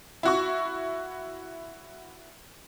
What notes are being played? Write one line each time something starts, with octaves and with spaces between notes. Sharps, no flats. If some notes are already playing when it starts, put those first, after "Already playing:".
E4 F#4 C#6